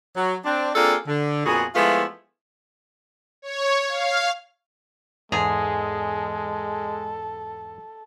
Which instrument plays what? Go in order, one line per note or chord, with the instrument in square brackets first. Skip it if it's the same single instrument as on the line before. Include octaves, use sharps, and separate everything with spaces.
[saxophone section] F#3
C4 D4
A#3 C4 D4 F4 G#4 A4
D3
F2 A#2 B3 F#4 G#4
F3 G#3 A3 B3 E4 F4
[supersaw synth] C#5
F5
[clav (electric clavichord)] E2 G#2 A#5 [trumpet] G#3 [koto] G#4 [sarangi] A4